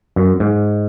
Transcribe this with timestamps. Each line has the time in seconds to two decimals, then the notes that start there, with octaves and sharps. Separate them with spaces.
0.16 F#2
0.40 G#2